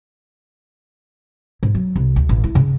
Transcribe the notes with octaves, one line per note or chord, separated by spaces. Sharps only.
G#2
F#3
C2
D2
A1
E4
C#3